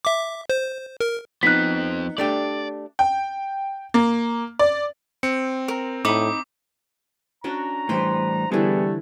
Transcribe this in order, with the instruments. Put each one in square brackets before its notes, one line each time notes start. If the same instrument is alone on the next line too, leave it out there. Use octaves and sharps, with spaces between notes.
[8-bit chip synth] E5 D6
C5
A#4
[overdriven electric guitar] F3 C4 [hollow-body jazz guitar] B3 D#4 [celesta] F#6 B6
[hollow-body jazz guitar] A3 D4 G4 [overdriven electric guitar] D5
[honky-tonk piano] G5
A#3
D5
[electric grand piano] C4 C#7
[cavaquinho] A#4
[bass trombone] A2 [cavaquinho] D#4 B5 D#6 [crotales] D6
[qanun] C#4 D4 F#4 [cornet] A#5
[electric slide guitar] A2 E3 G3 [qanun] B4 C5 G5
[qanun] D3 E3 [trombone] G3 [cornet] A3 [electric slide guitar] B3 G#4